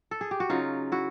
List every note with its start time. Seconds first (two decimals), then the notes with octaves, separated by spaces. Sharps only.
0.11 A4
0.21 G#4
0.31 G4
0.40 F#4
0.49 C#3 F#3 D#4 F4
0.92 E4 F#4